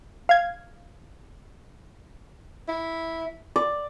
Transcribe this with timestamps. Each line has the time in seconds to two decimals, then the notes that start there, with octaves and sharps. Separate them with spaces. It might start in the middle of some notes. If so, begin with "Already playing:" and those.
0.29 F5 G#6
2.68 E4
3.56 D5